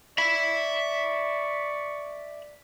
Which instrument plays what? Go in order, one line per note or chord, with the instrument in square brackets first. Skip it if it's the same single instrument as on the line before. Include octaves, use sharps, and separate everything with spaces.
[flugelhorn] D5 [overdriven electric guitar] E5 B5 [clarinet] C#6 [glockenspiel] B6